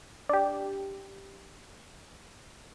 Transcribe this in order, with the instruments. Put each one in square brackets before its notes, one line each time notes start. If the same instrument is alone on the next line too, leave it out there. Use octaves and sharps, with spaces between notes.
[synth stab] D4 G4